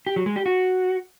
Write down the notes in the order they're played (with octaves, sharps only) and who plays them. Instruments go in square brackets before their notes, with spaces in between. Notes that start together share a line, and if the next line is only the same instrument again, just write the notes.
[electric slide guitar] G4
F#3
G#3
G4
F#4